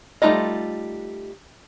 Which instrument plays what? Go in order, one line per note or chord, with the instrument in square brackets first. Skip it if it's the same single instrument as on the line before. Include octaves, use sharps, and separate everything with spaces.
[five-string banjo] G3 A3 D#4 F4 D#5